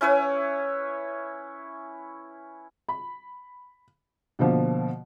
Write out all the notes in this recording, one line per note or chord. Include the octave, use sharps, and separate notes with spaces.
C#4 E4 B4 C#5
B5
B2 D3 F3 A#3